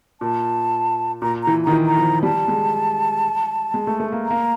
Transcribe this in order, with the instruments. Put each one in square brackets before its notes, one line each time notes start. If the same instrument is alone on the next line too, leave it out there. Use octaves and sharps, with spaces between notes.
[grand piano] A#2 [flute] A5
[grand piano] A#2 [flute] A#5
[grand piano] E3 [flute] A#5
[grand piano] D#3 [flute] A#5
[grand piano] E3
[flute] A#5
[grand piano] F3
[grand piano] G3 [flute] A5
[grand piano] G#3
G#3
A3
A3
A#3
[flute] A#5
[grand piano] A#3